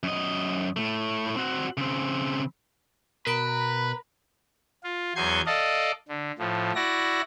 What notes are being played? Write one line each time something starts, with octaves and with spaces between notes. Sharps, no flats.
F#2 D#5
A2 A3
C4 F#4
C#3 C4
B2 A#4 B4 A#5 B5 B6 D7
F4
E2 F#3 G#5 C6 G6 G#6
A4 D5 D#5 F5
D3
A2 F3
E4 F#4 D5 A#6